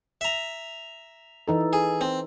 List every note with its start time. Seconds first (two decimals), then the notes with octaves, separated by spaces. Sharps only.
0.21 E5 A#5
1.48 E3 D#4 A4
1.73 G#4
2.01 C4